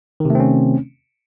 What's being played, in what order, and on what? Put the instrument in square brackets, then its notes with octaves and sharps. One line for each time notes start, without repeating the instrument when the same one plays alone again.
[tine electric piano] D#3
C3
A3
C4
C#4